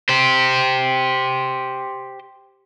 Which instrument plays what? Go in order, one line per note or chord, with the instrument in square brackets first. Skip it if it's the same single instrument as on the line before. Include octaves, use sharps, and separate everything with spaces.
[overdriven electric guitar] G4 C5